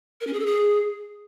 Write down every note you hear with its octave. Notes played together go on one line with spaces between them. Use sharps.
A#4
C#4
G#4
A4
G#4